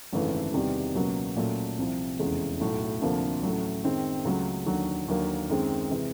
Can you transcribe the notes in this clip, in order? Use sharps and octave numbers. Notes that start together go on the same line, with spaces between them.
G#1 F#2 C#3 E3 A3
E2 C3 D#3 G3
C#2 B2 F#3 A#3
A#2 F#3 A3 C#4
C2 C3 F3
F1 E2 C#3 E3 G#3
B1 A2 F#3
D2 C3 F3 A#3 D4
A1 A2 F#3
F#2 D#3 G#3 C4
C#2 C#3 F#3 A3
D#2 D3 F#3
D#2 D3 F#3 A#3
F#2 D#3 G#3 C4
C3 E3 G#3